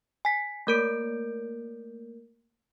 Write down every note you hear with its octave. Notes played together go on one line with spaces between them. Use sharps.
G#5 B6
A3 A#3 A#4 G6 D7